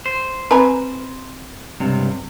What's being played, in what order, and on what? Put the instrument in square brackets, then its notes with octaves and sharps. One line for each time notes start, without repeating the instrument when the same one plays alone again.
[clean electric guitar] C5
[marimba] C4 [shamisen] B4 G#5 A#5
[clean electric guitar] C#2 G2 C3